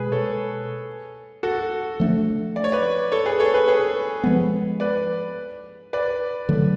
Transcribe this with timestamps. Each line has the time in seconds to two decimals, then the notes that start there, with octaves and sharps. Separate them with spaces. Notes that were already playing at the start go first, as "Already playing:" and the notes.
Already playing: B2 G#3 G#4 B4
0.12 A4 C#5
1.43 F#4 A4
2.00 F3 A3 D4
2.56 D5
2.64 C#5
2.72 B4 D5
3.12 A4 C#5
3.26 G#4 B4
3.40 A4 C#5
3.54 G#4 B4
3.68 G#4 B4
4.23 F3 G#3 B3
4.80 B4 D5
5.93 B4 D5
6.49 D3 F#3 A3